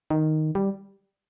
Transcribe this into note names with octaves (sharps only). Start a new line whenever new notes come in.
D#3
G3